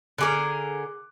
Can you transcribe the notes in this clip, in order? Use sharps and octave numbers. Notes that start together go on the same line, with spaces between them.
D3 G#4 A#4 D6 F#6